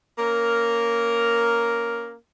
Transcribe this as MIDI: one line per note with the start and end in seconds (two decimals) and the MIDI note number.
0.18 2.13 58
0.18 2.13 61
0.18 2.13 70